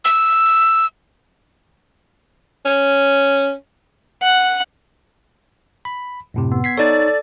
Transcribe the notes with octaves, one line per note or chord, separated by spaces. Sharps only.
E6
C#4
F#5
B5
F#2 A2 C3
B3
G#6 B6 C7
D#4 A4 C#5 D5 A6